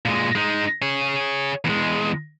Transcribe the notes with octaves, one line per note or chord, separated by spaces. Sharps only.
A#2 G#3
G#3 D#4
G#4 C#5
E2 G#3